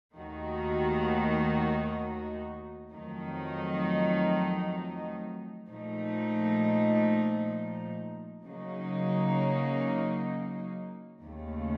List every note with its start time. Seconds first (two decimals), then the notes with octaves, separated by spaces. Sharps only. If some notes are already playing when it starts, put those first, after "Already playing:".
0.14 D#2 D#3 A3 D#4 F#4
2.90 F2 D#3 F#3 A3 D#4
5.68 A#2 F3 A3 D#4
8.44 C#3 F#3 A#3 D#4
11.21 D#2 C#3 A3